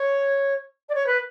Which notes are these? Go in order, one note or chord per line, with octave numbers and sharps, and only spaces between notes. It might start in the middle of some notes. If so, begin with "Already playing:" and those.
Already playing: C#5
D5
C#5
B4